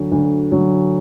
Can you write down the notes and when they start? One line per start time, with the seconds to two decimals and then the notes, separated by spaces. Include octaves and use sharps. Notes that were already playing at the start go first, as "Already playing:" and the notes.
Already playing: D2 D3 F#3
0.12 D2
0.52 D3 F#3